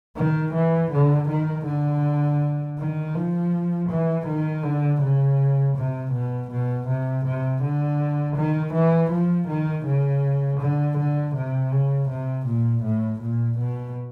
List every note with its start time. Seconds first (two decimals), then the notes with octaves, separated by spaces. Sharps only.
0.16 D#3
0.55 E3
0.92 D3
1.29 D#3
1.65 D3
2.78 D#3
3.15 F3
3.90 E3
4.27 D#3
4.63 D3
5.01 C#3
5.76 C3
6.13 B2
6.50 B2
6.88 C3
7.25 C3
7.62 D3
8.36 D#3
8.74 E3
9.11 F3
9.48 D#3
9.86 C#3
10.61 D3
10.98 D3
11.35 C3
11.72 C#3
12.09 C3
12.47 A#2
12.84 A2
13.21 A#2
13.58 B2